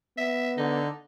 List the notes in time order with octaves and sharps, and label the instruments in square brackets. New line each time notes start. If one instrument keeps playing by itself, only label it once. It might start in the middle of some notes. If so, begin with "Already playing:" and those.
[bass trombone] B3 [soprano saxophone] E5
[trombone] D3 [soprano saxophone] D#4